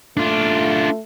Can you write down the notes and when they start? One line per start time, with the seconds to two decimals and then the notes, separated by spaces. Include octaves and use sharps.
0.17 A3 D4 F4